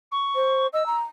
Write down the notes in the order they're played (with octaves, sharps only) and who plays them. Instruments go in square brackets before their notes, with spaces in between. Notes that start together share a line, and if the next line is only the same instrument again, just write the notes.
[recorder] C#6
[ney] C5
[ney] D#5 [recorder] E6
[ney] A#5